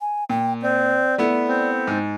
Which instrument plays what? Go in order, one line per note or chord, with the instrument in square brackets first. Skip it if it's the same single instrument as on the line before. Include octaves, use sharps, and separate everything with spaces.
[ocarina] G#5
[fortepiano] A#2 [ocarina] G5
[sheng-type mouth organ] C4 [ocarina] D5
[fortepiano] A3 B3 E4
[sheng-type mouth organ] C4
[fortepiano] G#2